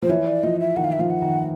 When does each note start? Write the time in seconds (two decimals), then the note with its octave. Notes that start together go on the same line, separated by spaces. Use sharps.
0.02 F3 C5
0.09 E3 C#5
0.26 D5
0.43 F3 D#5
0.60 E5
0.77 D#3 F#5
0.84 F5
0.92 E5
0.99 F3 F5
1.10 F#5
1.22 D#3